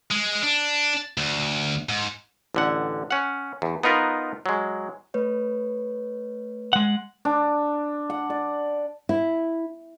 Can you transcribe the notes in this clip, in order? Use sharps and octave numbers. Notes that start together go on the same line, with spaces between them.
G#3
D4
D2
G#2
A1 D3 F#5
C#4 F#5
E2
B3 D#4 F4 A#4 B4
F#3 G#3
A3 B4 C#5
G#3 F#5
D4
F#5
D5
E4